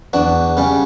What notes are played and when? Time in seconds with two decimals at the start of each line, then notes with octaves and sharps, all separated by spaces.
0.13 E2 D4 F#4
0.57 C#3 G3 C#4